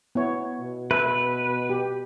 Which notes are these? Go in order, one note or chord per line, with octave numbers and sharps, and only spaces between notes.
B3 E4 C#5
B2
B4 E5
G4